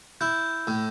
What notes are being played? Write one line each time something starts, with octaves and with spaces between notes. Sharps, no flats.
E4 G6
A2